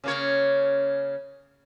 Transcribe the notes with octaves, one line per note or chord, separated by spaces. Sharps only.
C#3 A#3 C#5